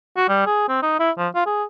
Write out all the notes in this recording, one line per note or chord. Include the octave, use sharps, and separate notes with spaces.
F#4
G3
G#4
C4
D#4
E4
F3
F4
G#4